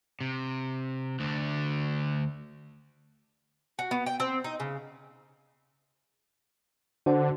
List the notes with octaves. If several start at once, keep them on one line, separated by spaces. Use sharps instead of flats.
C3
D2 D3
F#4
B3
G5
C4
D#4
C#3
D3 F#4 C5 F#5